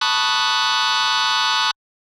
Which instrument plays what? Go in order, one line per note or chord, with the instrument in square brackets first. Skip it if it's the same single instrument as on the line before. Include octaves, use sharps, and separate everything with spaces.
[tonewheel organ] A5 B5 C#6 D#6 F#6